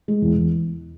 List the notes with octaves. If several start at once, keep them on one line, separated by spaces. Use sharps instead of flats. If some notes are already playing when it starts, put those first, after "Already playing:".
G#3
E2
E2